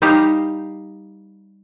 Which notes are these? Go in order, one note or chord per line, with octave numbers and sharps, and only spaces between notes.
G3 D#4 G4 F5 A#5